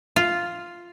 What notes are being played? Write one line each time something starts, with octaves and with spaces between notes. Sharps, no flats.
F4